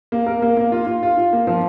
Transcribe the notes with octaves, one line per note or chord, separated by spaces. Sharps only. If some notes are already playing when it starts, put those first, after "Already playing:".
A#3
A#4
A#3
A#3
F4
F4
F4
F4
A#3
F3